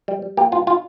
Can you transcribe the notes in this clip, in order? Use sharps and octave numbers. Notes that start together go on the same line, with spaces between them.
G3
G3
A#3 G4
G2 F4
F4